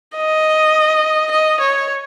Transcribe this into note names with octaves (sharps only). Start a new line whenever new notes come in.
D#5
D#5
C#5